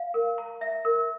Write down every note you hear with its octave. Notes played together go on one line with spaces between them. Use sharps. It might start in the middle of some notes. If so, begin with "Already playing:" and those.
Already playing: F5
A#4
A#5
E5
A#4